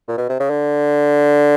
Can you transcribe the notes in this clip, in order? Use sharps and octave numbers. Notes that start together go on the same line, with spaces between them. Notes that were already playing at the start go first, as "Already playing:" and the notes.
A#2
B2
C3
C#3
D3